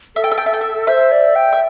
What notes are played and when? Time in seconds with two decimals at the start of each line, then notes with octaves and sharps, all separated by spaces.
0.16 A4 E5
0.24 G5
0.31 E5
0.38 G5
0.46 E5
0.53 G5
0.61 E5
0.87 C5 E5
1.12 D5
1.35 G5
1.53 E5